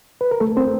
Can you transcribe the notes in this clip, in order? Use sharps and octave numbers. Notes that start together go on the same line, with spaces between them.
B4
A#4
A3 A4
C4 C5